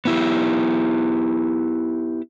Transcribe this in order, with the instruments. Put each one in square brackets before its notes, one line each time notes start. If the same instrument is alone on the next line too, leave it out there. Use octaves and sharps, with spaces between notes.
[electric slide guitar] B3 E4 G4